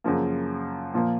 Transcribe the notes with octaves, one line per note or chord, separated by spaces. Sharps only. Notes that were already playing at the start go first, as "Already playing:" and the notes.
F#2 C#3 F3 A#3
A#2 F3 A#3